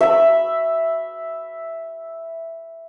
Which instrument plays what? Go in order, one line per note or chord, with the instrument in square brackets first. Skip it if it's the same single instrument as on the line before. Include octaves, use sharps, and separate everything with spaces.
[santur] E5 B5